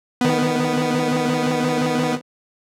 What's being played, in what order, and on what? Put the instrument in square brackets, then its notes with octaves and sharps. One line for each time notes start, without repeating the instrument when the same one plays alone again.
[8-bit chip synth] D#3 B3